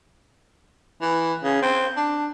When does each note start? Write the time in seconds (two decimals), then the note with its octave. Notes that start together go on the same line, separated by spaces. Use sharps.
1.02 E3
1.44 C#3
1.62 C4
1.97 D4